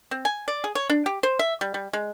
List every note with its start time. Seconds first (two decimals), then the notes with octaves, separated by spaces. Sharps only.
0.11 C4
0.25 G#5
0.48 D5
0.64 G#4
0.75 C#5
0.90 D4
1.06 G4
1.23 C5
1.39 E5
1.61 G3
1.74 G3
1.93 G#3